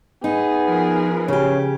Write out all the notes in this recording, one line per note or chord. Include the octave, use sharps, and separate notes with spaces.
B3 D#4 G#4
F3 A#4 B4
C#3 C#4 G4